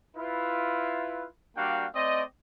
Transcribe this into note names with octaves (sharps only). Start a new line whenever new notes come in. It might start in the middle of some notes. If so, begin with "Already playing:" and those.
E4 F4 B4
G3 A#3 D4 F#4 F5 G5
A3 C4 D5 D#5